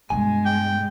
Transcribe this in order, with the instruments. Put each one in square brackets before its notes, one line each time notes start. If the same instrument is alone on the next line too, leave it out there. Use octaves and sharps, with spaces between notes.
[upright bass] G2 B2 [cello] G#3 [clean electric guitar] G#5
[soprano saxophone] G5